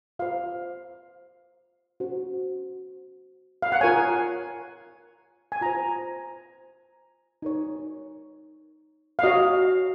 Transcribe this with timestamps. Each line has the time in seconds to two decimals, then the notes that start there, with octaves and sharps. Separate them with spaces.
0.19 F4 C5 F5
2.00 C#4 F#4 C5
3.62 F5
3.72 F#5
3.81 F4 A#4 C#5 G#5
5.52 G#5
5.61 F4 C5 A#5
7.42 D#4 A#4 C#5
9.19 F5
9.23 F#4 C#5 D#5